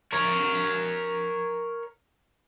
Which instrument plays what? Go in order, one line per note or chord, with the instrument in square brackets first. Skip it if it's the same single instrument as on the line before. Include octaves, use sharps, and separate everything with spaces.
[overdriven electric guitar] A#4 C#5